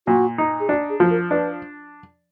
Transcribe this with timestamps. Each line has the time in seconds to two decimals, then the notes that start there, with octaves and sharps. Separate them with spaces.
0.07 A#2 F#4
0.38 D#4
0.60 G#4
0.69 D4 F#4
0.90 G#4
1.00 F3
1.10 A#4
1.31 D4 B4